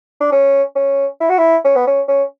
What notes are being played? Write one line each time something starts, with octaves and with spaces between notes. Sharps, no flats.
D4
C#4
C#4
E4
F#4
E4
C#4
B3
C#4
C#4